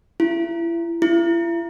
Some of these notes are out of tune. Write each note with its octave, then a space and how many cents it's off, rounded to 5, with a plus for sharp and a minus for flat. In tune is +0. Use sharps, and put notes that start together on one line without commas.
E4 +35
E4 +40